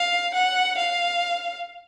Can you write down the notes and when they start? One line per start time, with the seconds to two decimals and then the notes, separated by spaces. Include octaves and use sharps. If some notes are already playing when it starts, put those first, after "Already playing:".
Already playing: F5
0.34 F#5
0.78 F5